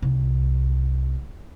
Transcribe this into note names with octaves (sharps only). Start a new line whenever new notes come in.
C2